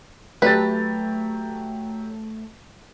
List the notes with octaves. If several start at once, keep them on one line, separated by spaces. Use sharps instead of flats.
F#3 A3 G4 B4 A6